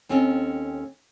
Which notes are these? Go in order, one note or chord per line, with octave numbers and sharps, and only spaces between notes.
D#2 C4 C#4 A4 D#5